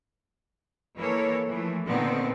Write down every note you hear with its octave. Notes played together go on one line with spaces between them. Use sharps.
E3 A#3 A4 C#5
E3 F3 A3
A#2 D3 D#3 B3 C4